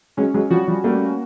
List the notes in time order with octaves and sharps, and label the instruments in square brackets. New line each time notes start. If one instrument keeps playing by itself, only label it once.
[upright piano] F#3 G#3 [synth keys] C#4
[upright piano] F#3 G#3
[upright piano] F3 G3 [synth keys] F#4
[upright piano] F3 G3
[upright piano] G3 A3 [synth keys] A#3